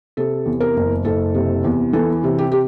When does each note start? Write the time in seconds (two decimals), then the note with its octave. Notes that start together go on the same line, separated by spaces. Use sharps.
0.17 C3 A4
0.46 E2
0.60 A#4
0.76 F#1
1.05 F#1 A4
1.35 C3
1.64 E2
1.93 E3 A4
2.24 C3
2.38 G4
2.52 G4